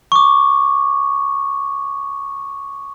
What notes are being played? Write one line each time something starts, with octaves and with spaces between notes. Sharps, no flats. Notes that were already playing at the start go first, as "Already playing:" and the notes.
C#6 D6